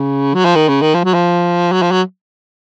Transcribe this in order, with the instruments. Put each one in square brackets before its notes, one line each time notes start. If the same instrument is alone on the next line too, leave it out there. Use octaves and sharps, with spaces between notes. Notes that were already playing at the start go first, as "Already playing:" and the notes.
Already playing: [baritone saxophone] C#3
F#3
F3
D#3
C#3
D#3
F3
F#3
F3
F#3
F3
F#3